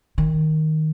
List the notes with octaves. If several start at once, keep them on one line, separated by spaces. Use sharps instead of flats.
D#3